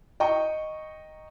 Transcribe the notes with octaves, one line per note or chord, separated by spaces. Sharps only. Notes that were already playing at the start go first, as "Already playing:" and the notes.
D#5 G5 A#5 C#6